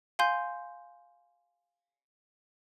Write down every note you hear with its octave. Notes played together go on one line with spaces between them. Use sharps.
F5 G#5 C6 G6